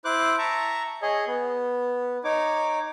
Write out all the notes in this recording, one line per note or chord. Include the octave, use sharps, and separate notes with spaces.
E4 C5 D6 F#6
E5 A5 A#5 C#6
G#4 C#5 D#5
B3
D#4 C#5 D6